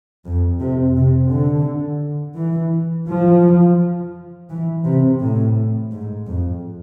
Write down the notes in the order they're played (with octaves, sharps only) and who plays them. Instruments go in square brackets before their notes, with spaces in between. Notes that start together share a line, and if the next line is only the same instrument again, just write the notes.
[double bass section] F2
C3
C3
D3
E3
F3
E3
C3
A2
G#2
F2